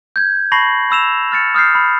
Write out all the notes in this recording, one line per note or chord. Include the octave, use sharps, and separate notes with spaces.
G6 G#6
A5 B5 C#6 A#6 C7 F#7
B5 E6 E7 F7
F6 A6 C#7
D#6 F6 G6 C7
B5